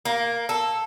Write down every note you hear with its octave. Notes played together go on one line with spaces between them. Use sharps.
A#3
A4